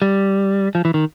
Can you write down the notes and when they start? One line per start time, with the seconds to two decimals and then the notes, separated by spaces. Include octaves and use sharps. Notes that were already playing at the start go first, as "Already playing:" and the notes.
0.02 G3
0.75 F3
0.85 E3
0.94 D#3